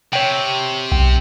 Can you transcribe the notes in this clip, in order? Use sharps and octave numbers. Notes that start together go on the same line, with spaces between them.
C3 C#5 G5
B1 G5